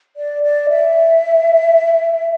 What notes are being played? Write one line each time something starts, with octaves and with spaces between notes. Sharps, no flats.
D5
D5
E5